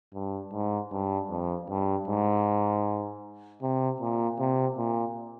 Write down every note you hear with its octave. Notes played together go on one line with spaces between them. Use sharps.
G2
G#2
G2
F2
G2
G#2
C3
A#2
C3
A#2